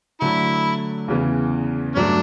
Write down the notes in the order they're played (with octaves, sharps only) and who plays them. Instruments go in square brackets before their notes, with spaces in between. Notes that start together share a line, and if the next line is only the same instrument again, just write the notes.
[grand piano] D3 F#3 A3 [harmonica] E4
[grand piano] E2 C#3 E3 B3
[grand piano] G2 F#3 A3 [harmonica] D4